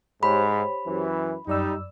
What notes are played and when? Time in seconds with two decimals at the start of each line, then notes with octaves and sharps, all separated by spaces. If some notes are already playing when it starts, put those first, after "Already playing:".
0.23 G#2 G4 C5 C#5 B5
0.87 F#2 E3
1.47 F#2 G3 D#4 D5 E6